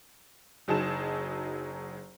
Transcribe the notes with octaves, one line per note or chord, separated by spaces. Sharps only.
F#1 F#3 D#4 G#4 A5 E7